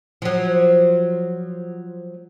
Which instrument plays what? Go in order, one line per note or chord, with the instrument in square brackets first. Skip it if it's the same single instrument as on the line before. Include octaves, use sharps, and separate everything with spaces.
[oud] F3 F#3